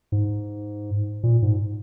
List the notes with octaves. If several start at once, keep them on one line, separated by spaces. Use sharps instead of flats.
G#2
A#2
G#2